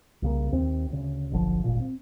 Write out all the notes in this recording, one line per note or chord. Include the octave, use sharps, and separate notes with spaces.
C2 C#3 A#3
D#2 C4
D2 C#3
F#1 B1 D3 F3
D#1 G#1 A#2
C4